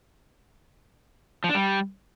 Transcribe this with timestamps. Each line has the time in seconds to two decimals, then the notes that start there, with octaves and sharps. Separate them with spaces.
1.44 F3
1.49 D4
1.55 G3